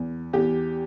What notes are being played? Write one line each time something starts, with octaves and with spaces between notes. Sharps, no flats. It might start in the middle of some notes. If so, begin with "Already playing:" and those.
Already playing: E2
E2 G4